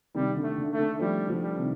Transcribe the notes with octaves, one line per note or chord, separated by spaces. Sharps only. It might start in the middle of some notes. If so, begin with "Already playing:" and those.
C3 D#3 G3
D3
A3
D3
A3
D3
F3 G3 A3
D3 F3
G3
C3 D#3